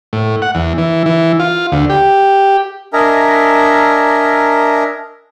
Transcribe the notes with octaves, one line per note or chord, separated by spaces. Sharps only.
A2
F#5
E2
E3
E3
F4
D2
G4
D4 A#4 D#5 E5 G#5 A#5